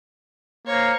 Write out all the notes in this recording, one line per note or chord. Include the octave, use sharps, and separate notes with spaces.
A#3 C5 C#5